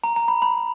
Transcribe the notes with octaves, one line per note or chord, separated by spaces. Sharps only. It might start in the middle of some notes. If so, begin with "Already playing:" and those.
A#5
A#5
B5
B5